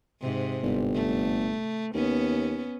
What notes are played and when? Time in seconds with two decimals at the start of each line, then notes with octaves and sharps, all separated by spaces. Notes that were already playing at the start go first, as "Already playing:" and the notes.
0.21 G#2 C3
0.63 G1
0.95 A3
1.95 D#2 B3 C#4